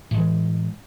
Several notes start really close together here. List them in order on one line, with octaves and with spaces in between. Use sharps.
A2 G#3 E3